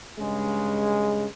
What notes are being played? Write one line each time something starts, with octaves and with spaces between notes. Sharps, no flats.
G2 C#3 G#3